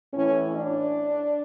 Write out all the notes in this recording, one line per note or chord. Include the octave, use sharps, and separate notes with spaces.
A2 E3 C#4
D4